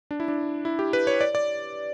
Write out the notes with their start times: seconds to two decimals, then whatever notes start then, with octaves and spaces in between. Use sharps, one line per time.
0.11 D4
0.20 E4
0.28 D4
0.65 E4
0.79 G4
0.93 B4
1.07 C#5
1.21 D5
1.35 D5